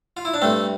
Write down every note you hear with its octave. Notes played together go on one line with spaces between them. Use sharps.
F4
E4
D4
G2 A3 C4